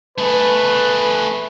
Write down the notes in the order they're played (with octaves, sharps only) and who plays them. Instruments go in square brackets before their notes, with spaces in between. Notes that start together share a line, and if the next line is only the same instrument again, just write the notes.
[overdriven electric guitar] A3 G#4 [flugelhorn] B4